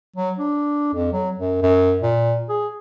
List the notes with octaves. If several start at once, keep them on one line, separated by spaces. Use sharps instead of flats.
F#3
D4
F2
F#3
F#2
F#2
A#2
G#4